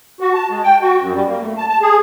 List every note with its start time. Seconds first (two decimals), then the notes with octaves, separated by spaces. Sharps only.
0.20 F#4
0.34 A5
0.50 G#3
0.64 G5
0.82 F#4
1.01 F#2
1.13 G3
1.28 A#3
1.42 A3
1.57 A5
1.69 A5
1.82 G#4